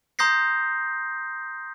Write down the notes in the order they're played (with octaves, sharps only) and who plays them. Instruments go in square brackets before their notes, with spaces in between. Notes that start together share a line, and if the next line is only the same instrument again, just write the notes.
[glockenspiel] A#5 C6 D#6 G6 A#6 C7